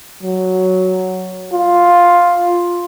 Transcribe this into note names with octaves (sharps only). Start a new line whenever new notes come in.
F#3
F4